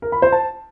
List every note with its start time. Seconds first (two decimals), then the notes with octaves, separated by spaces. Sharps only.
0.02 A#4
0.12 B5
0.22 C5
0.32 A5